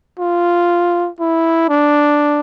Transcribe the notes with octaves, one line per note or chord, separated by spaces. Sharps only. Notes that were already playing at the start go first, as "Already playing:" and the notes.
F4
E4
D4